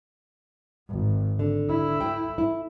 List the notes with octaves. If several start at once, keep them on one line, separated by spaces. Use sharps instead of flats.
G#1
D3
E4
G5
E4